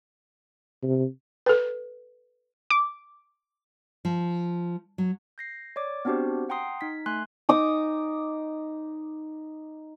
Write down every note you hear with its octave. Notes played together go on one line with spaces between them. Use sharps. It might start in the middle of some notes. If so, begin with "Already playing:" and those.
C3
A4 B4
D6
F3
F#3
G6 A#6 C7
C#5 D5 D6
B3 C4 D4 F#4 G4 C5
F#5 G5 A#5 C6 D#6 C7
D#4 B6
A3 G#5 C6 F#6
D#4 D6 D#6